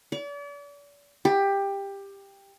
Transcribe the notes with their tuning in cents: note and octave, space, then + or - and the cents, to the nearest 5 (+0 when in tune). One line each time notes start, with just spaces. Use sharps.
D5 -40
G4 +15